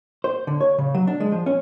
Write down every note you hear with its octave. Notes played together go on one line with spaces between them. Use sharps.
C5
D3
C#5
C#3
F#3
D4
G#3
F3
C#4